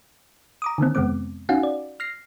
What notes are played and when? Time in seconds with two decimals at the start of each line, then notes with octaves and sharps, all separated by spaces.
0.62 A#5 D6 D#6
0.78 D3 D#3 A#3 C4
0.95 F2 C3 G#3 B3 C4 D6
1.49 C#4 D#4 F#4 F5 F#5 G#5
1.63 D5
2.00 F6 A#6 C7